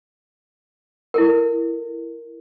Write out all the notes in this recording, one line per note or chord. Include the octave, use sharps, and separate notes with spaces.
E4 A4 A#4